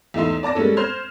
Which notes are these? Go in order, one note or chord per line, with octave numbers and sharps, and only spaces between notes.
E2 A3 D#4 E5 C6
D5 A5 D6 A#6
G3 G#3 A#3 C#4 A4
C5 C6 F6 G#6